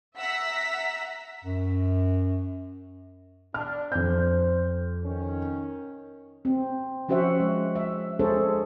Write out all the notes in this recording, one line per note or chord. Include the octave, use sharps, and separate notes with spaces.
E5 F#5 A#5 E6 B6
F#2
D4 F6
F2 C5 G6
D#3 C#4
C4
F3 C#4 F#4 C5 E5 F#5
G#3
E5
G#3 D4 G#4 A4 C5 C#5